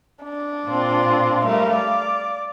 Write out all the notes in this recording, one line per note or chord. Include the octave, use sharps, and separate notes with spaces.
D4
A#2 C4 F4
G3 A3 A#4 F5
D5